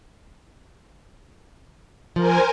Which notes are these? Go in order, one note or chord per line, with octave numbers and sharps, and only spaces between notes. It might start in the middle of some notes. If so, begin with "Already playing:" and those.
F3 A#4 C5 G#5